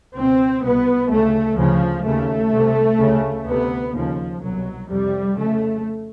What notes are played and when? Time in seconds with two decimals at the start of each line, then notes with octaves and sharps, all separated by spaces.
0.14 C#2 B2 C4
0.62 C2 B2 B3
1.09 D2 C#3 A3
1.57 D2 C#3 F3
2.04 D#2 C#3 A3
2.51 C2 C3
2.99 D2 C#3
3.46 D2 C3 B3
3.93 D#2 C#3 F3
4.41 C2 B2 F#3
4.88 F2 C3 G3
5.36 F2 C#3 A3